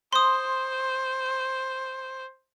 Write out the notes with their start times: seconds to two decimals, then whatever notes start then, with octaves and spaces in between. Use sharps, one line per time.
0.13 C5 C6 D#6